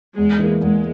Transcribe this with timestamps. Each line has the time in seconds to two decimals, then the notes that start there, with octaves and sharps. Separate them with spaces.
0.18 E2 G#3
0.39 E3 A#3
0.61 E2 G#3